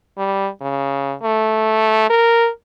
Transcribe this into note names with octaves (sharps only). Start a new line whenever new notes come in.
G3
C#3
A3
A#4